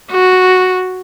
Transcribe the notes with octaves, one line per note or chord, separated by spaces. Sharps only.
F#4